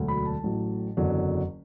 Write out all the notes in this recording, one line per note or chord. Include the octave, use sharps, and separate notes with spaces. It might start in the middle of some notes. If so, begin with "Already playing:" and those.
Already playing: E1 D2 D3 F#3
B5
A5
A1 A2 F#3
F#1 E2 D3 F#3